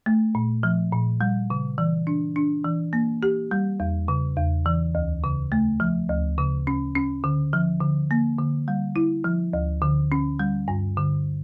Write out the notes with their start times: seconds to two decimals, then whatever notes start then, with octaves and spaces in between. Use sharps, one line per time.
0.06 A3
0.35 A#2
0.63 F3
0.92 A#2
1.21 G3
1.50 C#3
1.78 E3
2.07 D4
2.36 D4
2.64 E3
2.93 A#3
3.23 G4
3.51 G3
3.80 E2
4.08 C#3
4.36 E2
4.66 E3
4.95 D2
5.24 C#3
5.52 A3
5.80 F3
6.09 D2
6.38 C#3
6.67 C#4
6.95 C#4
7.24 D3
7.53 F3
7.81 D3
8.11 A#3
8.39 D3
8.68 G3
8.96 E4
9.24 F3
9.53 D2
9.82 D3
10.12 C#4
10.39 G3
10.68 G2
10.97 D3